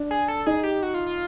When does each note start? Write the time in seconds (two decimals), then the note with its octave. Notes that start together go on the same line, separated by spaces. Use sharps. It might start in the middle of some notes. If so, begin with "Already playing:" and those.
Already playing: D4
0.11 G#4
0.28 A4
0.46 D#4 G#4
0.63 G4
0.83 F#4
0.94 F4
1.06 F4